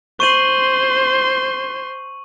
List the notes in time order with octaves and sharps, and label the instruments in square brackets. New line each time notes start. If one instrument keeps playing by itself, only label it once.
[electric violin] C5 C6 [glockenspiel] C#6 D#7 F#7